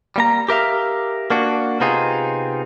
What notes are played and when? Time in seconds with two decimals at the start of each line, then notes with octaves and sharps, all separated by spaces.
0.16 G3 A#3 A#5
0.48 G4 A#4 E5 F5
1.30 A#3 D4 F#4
1.80 C3 B3 C4 D#4 F4 G#4